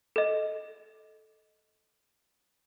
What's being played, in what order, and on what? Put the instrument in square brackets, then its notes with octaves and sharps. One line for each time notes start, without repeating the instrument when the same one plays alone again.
[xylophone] A4 D#5